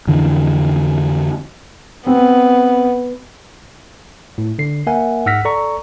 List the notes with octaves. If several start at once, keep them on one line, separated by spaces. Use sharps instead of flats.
F2 D3 E3
B3 C4
A2
D3 C7
A#3 A#4 E5 F#5 G#5
G#2 F#5 E6 F6 A#6 B6
A4 D5 A#5 C#6